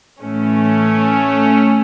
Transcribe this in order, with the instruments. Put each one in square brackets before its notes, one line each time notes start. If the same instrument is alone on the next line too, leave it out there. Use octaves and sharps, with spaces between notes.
[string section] A2 E3 A3 C#4